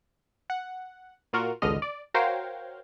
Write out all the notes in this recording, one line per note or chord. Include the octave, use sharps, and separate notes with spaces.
F#5
A#2 F4 F#4 A#4
G#1 C#2 D3 D#5 F6
D5
F#4 A#4 C5 C#5 F5 G5